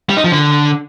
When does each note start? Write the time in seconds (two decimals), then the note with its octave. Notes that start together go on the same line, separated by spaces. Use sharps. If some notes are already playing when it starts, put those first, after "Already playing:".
0.09 G3
0.17 D#4
0.24 F3
0.32 D3